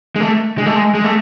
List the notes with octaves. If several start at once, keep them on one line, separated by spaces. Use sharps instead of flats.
G#3
A3
G#3
A3
G#3
G#3
A3